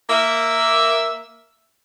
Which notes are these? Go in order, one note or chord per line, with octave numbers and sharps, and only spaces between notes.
A#3 E5